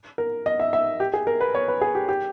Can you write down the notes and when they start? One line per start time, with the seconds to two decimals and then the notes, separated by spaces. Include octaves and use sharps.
0.18 A#4
0.46 D#5
0.60 E5
0.73 E5
1.00 G4
1.14 G#4
1.27 A#4
1.41 B4
1.55 C#5
1.68 B4
1.81 G#4
1.95 G4
2.09 G4